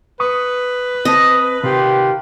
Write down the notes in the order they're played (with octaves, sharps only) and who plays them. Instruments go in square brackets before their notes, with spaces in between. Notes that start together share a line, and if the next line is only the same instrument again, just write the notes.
[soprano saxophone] B4 [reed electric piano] C#6 D#6
[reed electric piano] C4 A5 [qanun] D#5
[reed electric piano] C3 [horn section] D#3 F4 G4